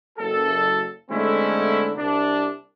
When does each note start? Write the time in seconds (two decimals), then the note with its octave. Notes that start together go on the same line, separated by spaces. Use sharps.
0.19 F#1 A4
1.11 D3 G#3 A3 C4 C#4 E4
1.97 C2 D4